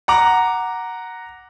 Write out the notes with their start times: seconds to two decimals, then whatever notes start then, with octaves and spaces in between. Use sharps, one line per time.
0.08 F#5 A#5 D6